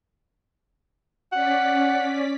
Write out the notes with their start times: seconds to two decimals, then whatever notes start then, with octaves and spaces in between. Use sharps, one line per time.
1.33 C#4 D5 F#5 B6